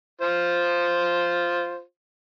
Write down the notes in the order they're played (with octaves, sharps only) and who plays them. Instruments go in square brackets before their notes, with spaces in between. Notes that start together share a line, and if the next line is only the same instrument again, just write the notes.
[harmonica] F4 C5